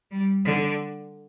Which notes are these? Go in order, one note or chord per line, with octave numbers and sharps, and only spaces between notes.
G3
D3